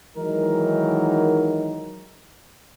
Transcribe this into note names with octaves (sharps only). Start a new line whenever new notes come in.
D#3 E3 F#3 G#3 D#4 A#4